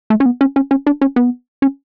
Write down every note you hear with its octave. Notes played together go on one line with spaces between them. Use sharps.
A3
C#4
B3
C#4
C#4
C#4
D4
C#4
B3
C#4